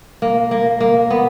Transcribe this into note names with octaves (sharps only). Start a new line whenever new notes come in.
A#3
A#3
A#3
B3